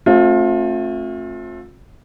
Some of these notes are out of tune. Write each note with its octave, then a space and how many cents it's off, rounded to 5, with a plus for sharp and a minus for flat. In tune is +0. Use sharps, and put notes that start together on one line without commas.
A3 +0 C4 +45 F4 +30